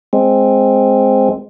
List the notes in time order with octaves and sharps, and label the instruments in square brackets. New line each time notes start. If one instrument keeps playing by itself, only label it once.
[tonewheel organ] G#3 C4